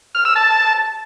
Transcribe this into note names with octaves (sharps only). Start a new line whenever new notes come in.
F6
E6
A5